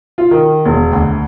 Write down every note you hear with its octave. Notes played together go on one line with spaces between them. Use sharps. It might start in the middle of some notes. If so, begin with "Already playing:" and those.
F4
D#3
E1
D2